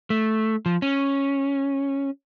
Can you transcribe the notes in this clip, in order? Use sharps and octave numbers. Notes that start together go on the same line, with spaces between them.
A3
F3
C#4